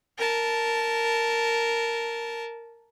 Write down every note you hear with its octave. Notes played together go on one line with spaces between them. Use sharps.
A#4 A5